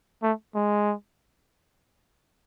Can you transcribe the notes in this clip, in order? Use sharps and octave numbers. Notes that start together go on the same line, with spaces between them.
A3
G#3